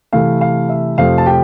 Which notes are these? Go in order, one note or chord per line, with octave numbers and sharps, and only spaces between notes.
C3 E3 A3 F5
F5
E5
F2 C3 F3 A3 C4 F5
A5
G4 G5